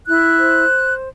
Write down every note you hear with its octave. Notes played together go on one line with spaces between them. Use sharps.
E4 F#6
C5